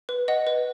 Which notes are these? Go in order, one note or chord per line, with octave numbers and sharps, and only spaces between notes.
B4
D#5 F#5
B4